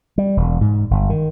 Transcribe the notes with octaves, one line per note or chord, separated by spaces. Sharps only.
G3
E1
G#2
G1
D#3